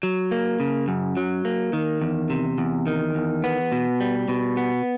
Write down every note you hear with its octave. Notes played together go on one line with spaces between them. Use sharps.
F#3
A#3
C#3
F#2
F#3
A#3
D#3
E2
C3
E2
D#3
E2
B3
B2
G3
B2
B3